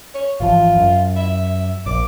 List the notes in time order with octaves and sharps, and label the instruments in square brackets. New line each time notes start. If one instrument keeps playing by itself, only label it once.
[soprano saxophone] C#5
[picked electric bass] G#1 E3 F3 [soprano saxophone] F4
[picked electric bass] F#2
[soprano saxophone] E5
[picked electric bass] A#1 [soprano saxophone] D6